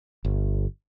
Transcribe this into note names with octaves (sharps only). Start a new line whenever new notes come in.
G1